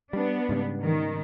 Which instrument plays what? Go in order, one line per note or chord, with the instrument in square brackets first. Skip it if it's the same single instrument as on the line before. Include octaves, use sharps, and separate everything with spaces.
[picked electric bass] G3 [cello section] B3 D4
[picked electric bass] G#2 C#3 G3
[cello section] D#3